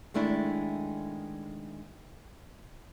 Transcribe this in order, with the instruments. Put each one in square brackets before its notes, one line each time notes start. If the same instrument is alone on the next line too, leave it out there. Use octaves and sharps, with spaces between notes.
[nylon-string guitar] D#3 G#3 A3 D4 E4